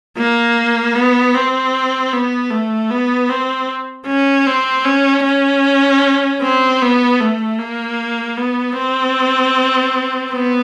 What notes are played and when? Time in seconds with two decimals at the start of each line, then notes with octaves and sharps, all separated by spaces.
0.17 A#3
0.95 B3
1.35 C4
2.13 B3
2.51 A3
2.91 B3
3.29 C4
4.08 C#4
4.47 C4
4.85 C#4
5.24 C#4
6.41 C4
6.81 B3
7.20 A3
7.59 A#3
8.37 B3
8.77 C4
10.33 B3